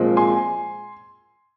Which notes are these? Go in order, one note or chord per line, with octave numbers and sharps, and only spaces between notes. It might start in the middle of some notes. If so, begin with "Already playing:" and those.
Already playing: A#2 F3 G#3 C4
G#5 C6